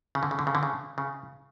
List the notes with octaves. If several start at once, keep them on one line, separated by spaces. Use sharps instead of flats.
C#3
D3
C#3
D3
C#3
D3
C#3
C#3